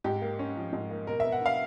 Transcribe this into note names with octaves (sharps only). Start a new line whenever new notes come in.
G#2 G4
A#3
C#4
F3
G#2
A#3
B2 A#4
B3 E5
F#5
D4 F5